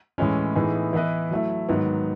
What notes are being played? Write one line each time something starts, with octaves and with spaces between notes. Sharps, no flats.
A2 E3 G#3 C#4
A2 E3 B3 D#4 G#4
E3 B3 E4 B4 D#5
F#3 A3 E4
G#2 D#3 F#3 B3